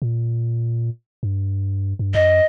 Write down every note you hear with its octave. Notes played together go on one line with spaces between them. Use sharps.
A#2
G2
G2
F#2 D#5